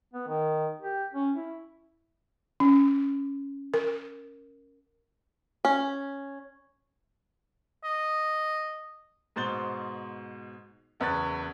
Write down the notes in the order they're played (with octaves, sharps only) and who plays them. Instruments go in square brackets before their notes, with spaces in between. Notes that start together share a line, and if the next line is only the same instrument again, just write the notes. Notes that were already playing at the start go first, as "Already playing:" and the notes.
[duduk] B3
D#3
G4
C#4
E4
[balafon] C#4
A#4
[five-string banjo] C#4
[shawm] D#5
[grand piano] G#2 B2 C5 A6 G7
F#1 E2 B4 C#6 F#6 A6